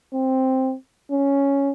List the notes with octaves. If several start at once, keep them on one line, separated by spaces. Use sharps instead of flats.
C4
C#4